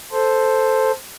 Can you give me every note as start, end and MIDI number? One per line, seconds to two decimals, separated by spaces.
0.12 0.92 69
0.12 0.92 72